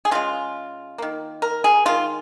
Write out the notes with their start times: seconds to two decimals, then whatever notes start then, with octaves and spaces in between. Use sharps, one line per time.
0.05 G#4
0.11 C#3 G#3 F4
0.98 D#3 A#3
1.42 A#4
1.64 G#4
1.85 D#3 G#3 F4